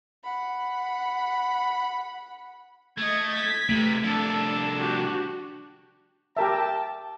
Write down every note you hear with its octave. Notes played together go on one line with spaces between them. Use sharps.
F#5 B5
A3 D#5 G#6
G#6 B6
G2 C3 A3
C2 F3 D4 A4
F#4 G4
G4 A#4 E5 G5 A5